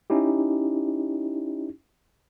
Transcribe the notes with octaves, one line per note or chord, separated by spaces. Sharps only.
C#4 D#4 E4 G4